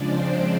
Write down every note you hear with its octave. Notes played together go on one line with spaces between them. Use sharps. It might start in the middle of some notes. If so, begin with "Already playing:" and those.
Already playing: C#3 F3 G#3 D4 D5
C4 C5